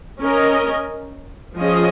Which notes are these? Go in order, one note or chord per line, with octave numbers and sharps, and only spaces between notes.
C#4 A#4 D#5
F3 C#4 G#4 D#5